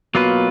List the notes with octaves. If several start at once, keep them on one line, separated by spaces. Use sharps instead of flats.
B2 F#3 A#3 F4 B4